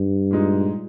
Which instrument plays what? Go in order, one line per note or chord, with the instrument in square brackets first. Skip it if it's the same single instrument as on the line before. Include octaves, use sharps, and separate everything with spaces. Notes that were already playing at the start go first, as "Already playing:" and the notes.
Already playing: [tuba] G2
[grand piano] A#2 G#3 D#4